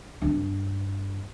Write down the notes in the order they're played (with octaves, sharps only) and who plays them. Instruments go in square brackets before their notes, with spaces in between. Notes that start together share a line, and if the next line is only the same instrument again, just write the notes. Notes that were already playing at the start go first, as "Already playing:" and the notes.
[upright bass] G2 D4